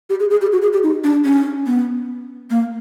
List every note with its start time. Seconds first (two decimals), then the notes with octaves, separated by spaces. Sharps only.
0.10 G4
0.20 G#4
0.31 G#4
0.41 G4
0.52 F#4
0.62 G#4
0.73 G4
0.83 D#4
1.04 D4
1.25 C#4
1.67 B3
2.50 A#3